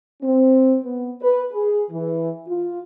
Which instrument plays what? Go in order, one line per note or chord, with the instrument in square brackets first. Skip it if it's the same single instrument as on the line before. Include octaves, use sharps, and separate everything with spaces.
[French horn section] C4
B3
B4
G#4
E3
F4